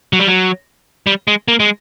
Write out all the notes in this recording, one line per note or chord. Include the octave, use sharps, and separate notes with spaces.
F#3
G3
F#3
G3
G#3
A#3
G#3